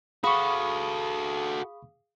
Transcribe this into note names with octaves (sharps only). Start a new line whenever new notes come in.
F#4 G#4 A4 F5 B5 C#6 D#6